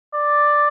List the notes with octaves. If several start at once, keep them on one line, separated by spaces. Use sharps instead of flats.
D5